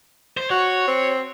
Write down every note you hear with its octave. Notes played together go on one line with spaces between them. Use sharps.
C5
F#4 C#5
C4